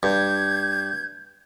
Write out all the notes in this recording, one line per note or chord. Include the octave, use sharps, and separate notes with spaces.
G2 G6 G#6